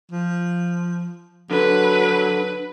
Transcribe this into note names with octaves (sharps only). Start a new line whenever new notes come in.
F3
D3 F#3 B4